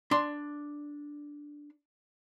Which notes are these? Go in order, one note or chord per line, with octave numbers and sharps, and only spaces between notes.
D4 C6